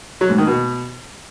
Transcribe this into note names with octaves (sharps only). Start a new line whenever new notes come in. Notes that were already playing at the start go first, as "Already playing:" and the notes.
F#3
G#2
D#3
B2